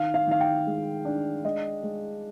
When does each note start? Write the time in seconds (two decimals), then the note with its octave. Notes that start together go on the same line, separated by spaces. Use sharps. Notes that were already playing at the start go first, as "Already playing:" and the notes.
Already playing: D#3 F5
0.14 F5
0.27 D#3 F5
0.40 G5
0.67 G#3
1.05 D4
1.44 G#3 D#5
1.83 G#3